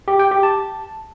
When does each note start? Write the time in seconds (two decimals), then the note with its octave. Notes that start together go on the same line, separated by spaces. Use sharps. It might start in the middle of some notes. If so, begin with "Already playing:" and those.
0.08 G4
0.19 G5
0.31 G4
0.43 A5